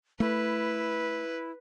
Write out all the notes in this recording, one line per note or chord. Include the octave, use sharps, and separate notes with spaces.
A3 E4 B4